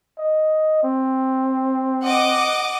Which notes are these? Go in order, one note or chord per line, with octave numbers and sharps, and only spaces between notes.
D#5
C4
D#5 F#5 D6